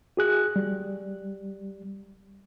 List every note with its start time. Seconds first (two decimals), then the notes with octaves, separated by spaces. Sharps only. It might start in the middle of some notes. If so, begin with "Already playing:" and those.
0.17 F#4 G#4 F#6
0.56 G3